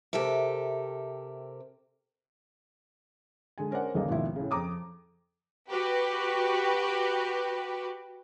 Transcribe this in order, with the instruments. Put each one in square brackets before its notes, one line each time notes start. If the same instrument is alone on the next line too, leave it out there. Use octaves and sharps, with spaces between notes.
[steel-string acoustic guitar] C3 G4 A4 A#4 E5
[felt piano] D3 G#3 G#5
C#4 A#4 C5 D5 F#5
G1 D#2 C#3 A#3 A4 D#5
G#1 D#2 B2 F3 E4
A2 C#3
F2 A#5 D6 D#6
[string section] F#4 G4 B4